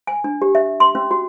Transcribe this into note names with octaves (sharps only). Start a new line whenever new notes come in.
G#5
D4
G4
E5
C6
C#4
F#4